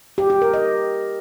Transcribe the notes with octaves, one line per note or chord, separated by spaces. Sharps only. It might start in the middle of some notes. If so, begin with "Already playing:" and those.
G4
G4
A#4
D#5